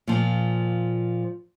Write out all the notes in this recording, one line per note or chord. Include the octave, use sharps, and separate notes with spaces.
A#2 F3